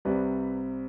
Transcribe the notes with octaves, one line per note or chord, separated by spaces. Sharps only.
C2 C3 G3 C4 B4 D5